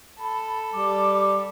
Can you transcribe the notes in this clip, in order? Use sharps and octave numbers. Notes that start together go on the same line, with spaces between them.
A4 B5
G3 D6